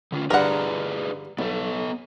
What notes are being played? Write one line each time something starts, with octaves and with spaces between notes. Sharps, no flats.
D3 C#4 F4
G2 D3 D4 G#4 A#4 B4 F#5
B1 B3 A4